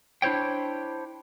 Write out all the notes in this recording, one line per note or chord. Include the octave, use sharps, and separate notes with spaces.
D4 E4 C5 C#5 G5